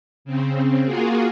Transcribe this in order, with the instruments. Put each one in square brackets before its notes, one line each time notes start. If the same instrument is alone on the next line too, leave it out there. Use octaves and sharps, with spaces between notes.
[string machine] C#3 C4
A#3 F4 F#4 G#4